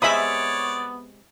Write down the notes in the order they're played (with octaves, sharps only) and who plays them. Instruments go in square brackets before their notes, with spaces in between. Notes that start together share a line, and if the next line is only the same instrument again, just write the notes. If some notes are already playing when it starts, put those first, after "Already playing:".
[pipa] C3 G#3 [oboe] B3 [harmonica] C#5 D5 [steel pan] E5 B5 D#6